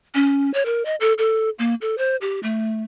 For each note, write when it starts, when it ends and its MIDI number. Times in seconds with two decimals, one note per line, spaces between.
0.15 0.51 61
0.54 0.63 73
0.66 0.83 70
0.85 0.95 75
1.00 1.13 69
1.18 1.50 69
1.59 1.75 58
1.81 1.96 69
1.98 2.16 72
2.21 2.40 67
2.43 2.83 57